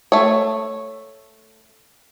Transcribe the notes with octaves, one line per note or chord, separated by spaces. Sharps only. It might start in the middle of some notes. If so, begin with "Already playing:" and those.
A3 C#5